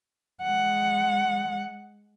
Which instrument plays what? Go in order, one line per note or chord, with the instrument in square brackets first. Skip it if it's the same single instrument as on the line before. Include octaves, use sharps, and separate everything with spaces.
[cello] G#3 F#5